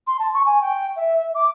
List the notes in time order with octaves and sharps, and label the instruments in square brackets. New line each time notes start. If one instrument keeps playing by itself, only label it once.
[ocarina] C6
A5
C#6
G#5
G5
E5
E5
D6